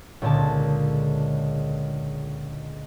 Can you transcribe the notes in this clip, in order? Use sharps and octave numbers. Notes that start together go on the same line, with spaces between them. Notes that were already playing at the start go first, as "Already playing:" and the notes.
C#2 A#2 D3 G#4 A5